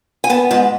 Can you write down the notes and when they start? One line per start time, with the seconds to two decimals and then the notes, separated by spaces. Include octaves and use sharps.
0.24 G#5
0.30 B3 A5
0.51 G#2 A5